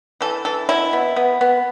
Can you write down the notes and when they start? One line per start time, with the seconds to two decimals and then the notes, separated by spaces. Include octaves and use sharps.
0.21 E3 A4
0.45 E3 A4
0.69 B2 E4
0.93 B3
1.16 B3
1.41 B3